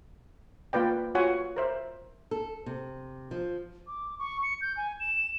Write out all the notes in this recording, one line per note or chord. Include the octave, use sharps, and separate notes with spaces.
A#3 F4 B4 D5 G5
F4 F#4 C#5 F#5 G#5
A#4 C5 E5
A4
C3
F3
D6
C#6
C#7
G6
G#5
E7